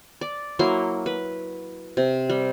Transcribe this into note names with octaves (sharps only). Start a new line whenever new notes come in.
D5
F#3 A#3 E4 C6
B4
C3
G3